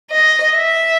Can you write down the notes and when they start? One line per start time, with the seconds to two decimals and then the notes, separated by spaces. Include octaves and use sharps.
0.11 D#5
0.56 E5